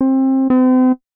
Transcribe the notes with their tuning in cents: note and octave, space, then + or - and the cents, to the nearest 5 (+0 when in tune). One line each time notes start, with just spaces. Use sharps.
C4 +25
C4 -40